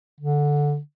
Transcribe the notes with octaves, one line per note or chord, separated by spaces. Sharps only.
D3